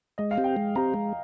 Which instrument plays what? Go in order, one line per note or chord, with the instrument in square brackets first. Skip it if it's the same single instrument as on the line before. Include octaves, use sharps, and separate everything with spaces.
[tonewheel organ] G#3 [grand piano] D#5
[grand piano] F5
[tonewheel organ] C4 G4
[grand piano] G5
[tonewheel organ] G#3
[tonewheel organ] C4 G4 [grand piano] A#5
[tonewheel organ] G#3